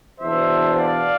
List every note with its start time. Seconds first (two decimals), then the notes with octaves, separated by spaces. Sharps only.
0.20 E2 B2 B3 D4 C5 E5
0.75 D5 F5